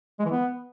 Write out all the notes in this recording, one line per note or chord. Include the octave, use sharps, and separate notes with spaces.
G#3
E3
B3